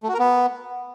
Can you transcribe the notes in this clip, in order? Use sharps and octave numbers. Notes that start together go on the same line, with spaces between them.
A3
F#4
A#4
B3